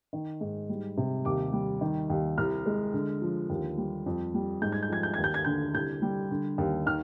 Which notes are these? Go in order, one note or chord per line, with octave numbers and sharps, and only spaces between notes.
D#3
G#2
G3
C3
D#2 D6
G3
D#3
D#2
C2 F6
G#3
D3
F3
D#2
G3
F2
G3
G#2 G6
G#6
G6
F3 G#6
G6
D#2 G#6
G6
G#6
D3 G6
C2 G6
G3
D3
D#2
D#3 F6